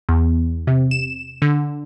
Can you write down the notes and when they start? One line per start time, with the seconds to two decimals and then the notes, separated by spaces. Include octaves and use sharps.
0.09 E2
0.67 C3
0.91 E7
1.42 D3